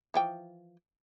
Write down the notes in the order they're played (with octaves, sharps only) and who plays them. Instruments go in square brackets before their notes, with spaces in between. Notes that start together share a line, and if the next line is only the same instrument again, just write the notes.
[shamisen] E3 F3 G5